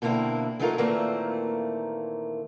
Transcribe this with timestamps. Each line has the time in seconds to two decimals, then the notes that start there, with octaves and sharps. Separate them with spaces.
0.02 B2 D3 A#3 C4 E4
0.59 E3 F#3 A3 D#4 F4 A#4
0.78 A#2 D#3 E3 A3 A#3 C4